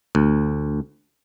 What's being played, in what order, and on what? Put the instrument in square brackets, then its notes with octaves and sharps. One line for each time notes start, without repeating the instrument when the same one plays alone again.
[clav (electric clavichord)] D2